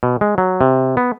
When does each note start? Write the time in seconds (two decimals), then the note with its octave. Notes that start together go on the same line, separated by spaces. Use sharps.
0.03 B2
0.21 G#3
0.38 F#3
0.61 C3
0.97 B3